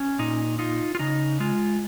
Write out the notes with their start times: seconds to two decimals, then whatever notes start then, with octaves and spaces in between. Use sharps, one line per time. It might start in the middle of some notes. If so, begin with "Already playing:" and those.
Already playing: C#4
0.19 A#2 D#4
0.59 D#4 F4
0.95 F4
0.99 C#3 D#4
1.40 G#3 F4